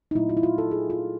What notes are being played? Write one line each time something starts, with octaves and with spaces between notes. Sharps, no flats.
D#4
A#2 F#3 A3 E4
F4
E4
F4
A4
G#4
F4